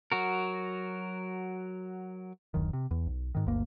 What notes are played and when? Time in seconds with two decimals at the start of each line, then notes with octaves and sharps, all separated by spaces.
0.12 F#3 F#4 A#4
2.54 D1 F#2 D#3
2.73 C3
2.91 E2
3.07 B1
3.35 G#2 D#3
3.46 G1 D2 G2 A#3